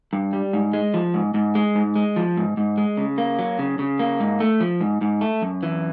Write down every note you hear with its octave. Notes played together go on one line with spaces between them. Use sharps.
G2
G3
G#2
G#3
F3
G#2
G#2
G#3
G#2
G#3
F3
G#2
G#2
G#3
C#3
A#3
F#3
C#3
C#3
A#3
G#2
A3
F3
G#2
G#2
A3
F#2
E3